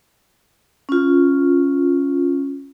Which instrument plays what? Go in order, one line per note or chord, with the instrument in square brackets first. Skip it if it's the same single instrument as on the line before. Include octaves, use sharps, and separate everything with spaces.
[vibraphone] C#4 F4